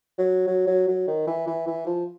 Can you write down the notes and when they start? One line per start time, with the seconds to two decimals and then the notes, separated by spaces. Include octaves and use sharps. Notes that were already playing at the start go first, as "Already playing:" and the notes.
0.18 F#3
0.47 F#3
0.67 F#3
0.88 F#3
1.08 D#3
1.27 E3
1.48 E3
1.67 E3
1.86 F3